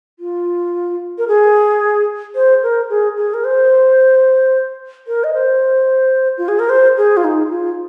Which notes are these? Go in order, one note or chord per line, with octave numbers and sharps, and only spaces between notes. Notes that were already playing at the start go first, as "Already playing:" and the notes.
F4
A#4
G#4
C5
A#4
G#4
G#4
A#4
C5
A#4
D#5
C5
F4
G#4
A#4
C5
G#4
F4
D#4
F4